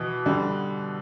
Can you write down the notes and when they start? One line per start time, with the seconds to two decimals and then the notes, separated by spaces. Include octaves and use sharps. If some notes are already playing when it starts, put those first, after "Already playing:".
Already playing: B2 E3
0.26 D3 G3